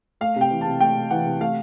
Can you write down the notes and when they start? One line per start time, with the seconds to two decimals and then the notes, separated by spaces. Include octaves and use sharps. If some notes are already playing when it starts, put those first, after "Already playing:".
0.21 A3 F5
0.36 C3
0.41 G5
0.51 E3
0.61 C3 A5
0.80 A3 G5
0.96 C3
1.11 E3 F#5
1.26 C3
1.40 A3 F5